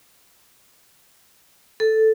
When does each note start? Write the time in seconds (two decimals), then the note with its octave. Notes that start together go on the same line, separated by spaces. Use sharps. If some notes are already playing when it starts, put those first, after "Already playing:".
1.80 A4